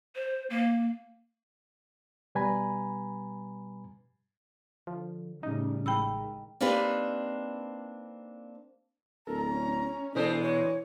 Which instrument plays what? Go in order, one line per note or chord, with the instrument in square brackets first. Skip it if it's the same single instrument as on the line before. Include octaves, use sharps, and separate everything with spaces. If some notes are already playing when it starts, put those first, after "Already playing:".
[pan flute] C5
A#3
[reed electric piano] B2 G3 B4 G#5 A#5 B5
[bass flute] D3 [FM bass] F3
[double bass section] A2 C#3 G3 [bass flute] C#4 [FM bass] D#4
[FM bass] A1 [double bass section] D#3 [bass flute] G#3 [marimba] G5 B5 E6
[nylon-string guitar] A#3 C4 D4 D#4 G4 B4
[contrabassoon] D1 [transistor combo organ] A4 A#4 [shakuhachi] A#5
[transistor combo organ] C#4
[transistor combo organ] B2 [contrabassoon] E3 [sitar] G#3 D4 C5 [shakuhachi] A4
[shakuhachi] C#5